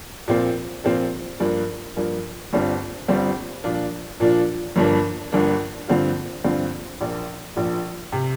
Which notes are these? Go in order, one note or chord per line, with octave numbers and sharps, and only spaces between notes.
A#2 F3 C4 F4
A#2 F3 C4 F4
G2 F3 A#3
G2 F3 A#3
G1 G2 G3 C4 F4
G1 G2 G3 C4 F4
A#2 F3 D4 F4
A#2 F3 D4 F4
G1 G2 F3 A#3 D4
G1 G2 F3 A#3 D4
G2 D3 F3 C4 F4
G2 D3 F3 C4 F4
A#1 A#2 F3
A#1 A#2 F3
C3